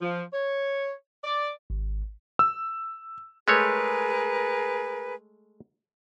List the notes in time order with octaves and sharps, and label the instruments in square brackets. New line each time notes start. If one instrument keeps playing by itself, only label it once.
[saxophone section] F3
C#5
D5
[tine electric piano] G#1
[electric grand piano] E6
[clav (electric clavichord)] G#3 A3 C#5 [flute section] G#4 A#4 B4